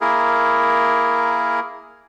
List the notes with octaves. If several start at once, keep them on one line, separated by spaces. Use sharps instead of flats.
A#3 E4 G#4 A#4